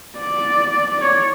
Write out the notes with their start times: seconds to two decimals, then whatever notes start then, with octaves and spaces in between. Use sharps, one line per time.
0.18 D5
1.01 C#5 D5